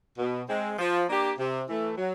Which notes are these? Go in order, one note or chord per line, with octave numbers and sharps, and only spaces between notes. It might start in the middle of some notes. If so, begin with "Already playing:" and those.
B2
G#3 C4
F3
A#3 D4 G4
C3
E3 A3
F#3